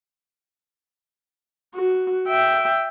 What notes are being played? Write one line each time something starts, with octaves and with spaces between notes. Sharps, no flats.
F#4
E5 G5